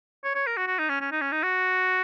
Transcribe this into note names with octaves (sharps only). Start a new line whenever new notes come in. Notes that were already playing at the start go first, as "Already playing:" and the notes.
C#5
C#5
A#4
F#4
F#4
D#4
C#4
C#4
D#4
C#4
D#4
F#4